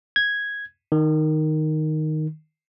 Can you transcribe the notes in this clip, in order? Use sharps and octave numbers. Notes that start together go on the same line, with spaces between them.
G#6
D#3